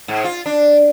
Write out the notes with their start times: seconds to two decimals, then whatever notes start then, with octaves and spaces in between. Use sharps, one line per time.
0.08 G#2
0.24 F4
0.46 D4